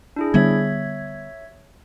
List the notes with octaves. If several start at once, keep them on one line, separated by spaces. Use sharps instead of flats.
D4 E4 G#4
D3 G3 B3 C#5 E5 G#6